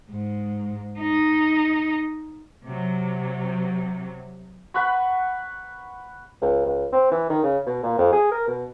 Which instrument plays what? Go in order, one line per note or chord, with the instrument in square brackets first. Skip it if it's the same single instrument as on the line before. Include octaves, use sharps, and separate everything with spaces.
[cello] G#2
D#4
[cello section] C3 F#3
[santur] B4 F#5 B5 C#6
[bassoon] C#2
C#2
C4
E3
D#3
C#3
B2
A#2
F2
G#4
A#4
B2